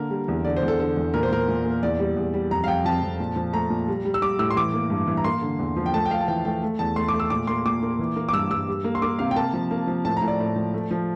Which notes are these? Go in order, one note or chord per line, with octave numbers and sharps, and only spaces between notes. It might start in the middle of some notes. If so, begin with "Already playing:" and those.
Already playing: D3 A#3 A#4
G3
E2
D3 D5
C5
E2
A4
D3 A4
E2
A#2 A#4
C5
A#2 A#4
A#2
A#3
E2 D5
G3
E2
G3
F2 A#5
F5
F2 G5
F2 A5
F2
A#2
F3
A3 A#5
A#2
G3
G3
E6
G3 D6
A2 E6
C6
E3 D6
A#3
G2
E3
A#5
A#3 C6
D3
E2
F3
G5
A3 A5
G5
A3 F5
A5
E3 G5
A3 G5
A3
E2 A5
A3 C6
D6
A3
E6
A#2 D6
A#3 C6
A#2 D6
A#3
E3
A#3
D6
G2 E6
G2 E6
G3
A#3
C6
A#3 D6
C3 F5
G5
A#3 A5
F3
A#3
F3
A2 A5
A#5
A2
D5
A2
F3
A3
F3